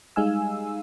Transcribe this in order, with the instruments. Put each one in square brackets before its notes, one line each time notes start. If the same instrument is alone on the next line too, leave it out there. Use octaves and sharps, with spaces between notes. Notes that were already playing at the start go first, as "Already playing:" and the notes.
[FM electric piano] G3 G#3 D#4 F5 G#5 E6